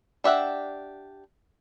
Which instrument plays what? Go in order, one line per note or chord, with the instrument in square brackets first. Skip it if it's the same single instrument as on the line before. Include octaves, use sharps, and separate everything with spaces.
[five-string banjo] D4 G4 E5 F#5